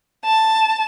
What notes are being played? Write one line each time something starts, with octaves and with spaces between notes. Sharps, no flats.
A5